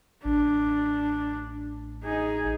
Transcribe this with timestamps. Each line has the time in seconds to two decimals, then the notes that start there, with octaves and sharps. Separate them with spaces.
0.25 A1 D4
2.04 D#4 G#4